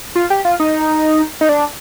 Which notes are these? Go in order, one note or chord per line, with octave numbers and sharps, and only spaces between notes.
F4
G4
F4
D#4
D#4
D4